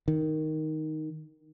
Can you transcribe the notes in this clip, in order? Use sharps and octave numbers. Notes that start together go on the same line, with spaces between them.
D#3